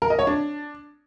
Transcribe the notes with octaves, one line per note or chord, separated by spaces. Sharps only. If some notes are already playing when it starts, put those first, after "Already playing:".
A#4
D#5
C#5
D4